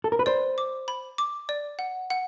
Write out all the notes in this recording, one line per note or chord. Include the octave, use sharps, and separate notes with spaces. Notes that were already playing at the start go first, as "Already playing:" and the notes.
A4
A#4
B4
C5 D5
D6
B5
D6
D5
F#5
F#5